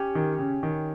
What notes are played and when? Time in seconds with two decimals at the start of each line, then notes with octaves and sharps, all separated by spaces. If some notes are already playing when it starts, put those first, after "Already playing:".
Already playing: C#4 G4 C#5
0.15 D#3
0.38 C#3
0.63 D#3